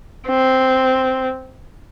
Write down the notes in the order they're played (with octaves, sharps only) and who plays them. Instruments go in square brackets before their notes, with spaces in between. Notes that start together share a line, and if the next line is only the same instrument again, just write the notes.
[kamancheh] C4